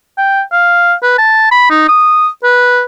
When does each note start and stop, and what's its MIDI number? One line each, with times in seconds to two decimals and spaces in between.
0.18 0.42 79
0.52 0.94 77
1.03 1.17 71
1.18 1.51 81
1.51 1.66 83
1.70 1.86 63
1.89 2.28 87
2.44 2.82 71